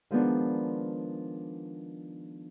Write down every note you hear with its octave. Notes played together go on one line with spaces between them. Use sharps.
D#3 F3 G#3 B3 D4